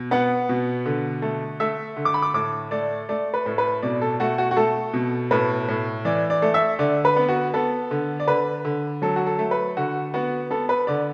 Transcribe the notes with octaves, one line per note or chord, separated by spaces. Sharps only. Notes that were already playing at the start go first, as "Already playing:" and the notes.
Already playing: B2
B3 F#5
B2
D3
A3
A3 E5
D3
D6
B5
D6
A2 D6
A3 D5
A3 D5
B4
A2
B4
B2 D5
A4
A3 F#4
F#4
F#4
A3 A4
B2
A2 B4
A2
E3 D5
D5
A3
E5
D3 D5
B4
B3
F#4
B3 A4
D3
D5
D3 B4
D3
F#3 A4
F#4
A4
A3
B4
D3 F#4
B3 F#4
B3 A4
B4
D3 D5